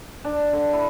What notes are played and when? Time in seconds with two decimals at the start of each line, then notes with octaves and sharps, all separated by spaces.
0.25 D4
0.53 D3
0.73 E4